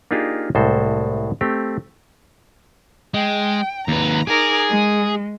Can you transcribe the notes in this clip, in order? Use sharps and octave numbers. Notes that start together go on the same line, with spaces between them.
A#3 D4 D#4 F4 G4 G#4
C2 A2 G#3 A4 C5
A3 C4 G4
G#3 G5
D#2 B4 A#5
D#4 G#4 A#4 D6
G#3